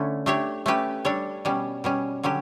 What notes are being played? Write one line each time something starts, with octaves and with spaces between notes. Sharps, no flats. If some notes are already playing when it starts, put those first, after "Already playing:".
Already playing: D3 A3 C#4 E4
A3 D4 G4 C#5
A3 C#4 G4 B4
G3 D4 A4 C#5
B2 G3 C#4
B2 G3 C#4
D3 F#3 C#4 G4